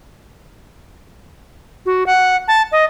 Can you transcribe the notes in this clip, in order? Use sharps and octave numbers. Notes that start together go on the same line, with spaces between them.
F#4
F#5
A5
D#5